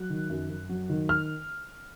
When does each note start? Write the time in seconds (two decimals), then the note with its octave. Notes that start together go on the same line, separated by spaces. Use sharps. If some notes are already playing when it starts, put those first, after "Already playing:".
Already playing: F#3 F#6
0.10 D#3
0.30 F#2
0.50 F#2
0.69 F#3
0.90 D#3
1.09 F6